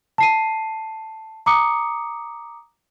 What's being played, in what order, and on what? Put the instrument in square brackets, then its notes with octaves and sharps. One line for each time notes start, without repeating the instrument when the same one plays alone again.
[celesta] A5 C7 D#7
A#5 D6 D#6 C#7